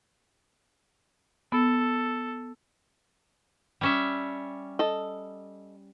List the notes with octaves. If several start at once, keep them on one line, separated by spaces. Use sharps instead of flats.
B3 A4
G3 C#4 E5
A4 D#5